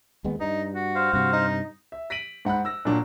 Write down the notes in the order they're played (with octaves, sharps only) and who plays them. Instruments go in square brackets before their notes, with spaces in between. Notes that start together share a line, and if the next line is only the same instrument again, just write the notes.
[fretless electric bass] D#2 G#3 B3
[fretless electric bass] G2 [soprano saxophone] D#4
[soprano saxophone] F#4
[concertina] C5 F5
[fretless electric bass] G2 C3 [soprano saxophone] F#4
[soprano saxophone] D#4
[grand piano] E5
A#6 B6 D7 D#7 F#7
G#2 F#5 B5 F#6
E6 A#6
A#2 F#3 D4